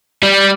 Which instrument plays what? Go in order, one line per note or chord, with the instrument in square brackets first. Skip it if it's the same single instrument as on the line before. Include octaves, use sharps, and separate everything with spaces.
[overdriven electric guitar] G3